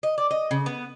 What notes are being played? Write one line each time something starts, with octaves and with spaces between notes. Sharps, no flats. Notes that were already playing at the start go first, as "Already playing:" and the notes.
D#5
D5
D#5
C#3
B3